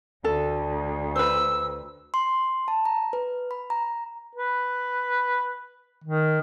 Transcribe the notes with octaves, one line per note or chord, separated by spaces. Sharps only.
D2 A4
B4 C5 E6
C6
A5
A#5
B4
B5
A#5
B4
D#3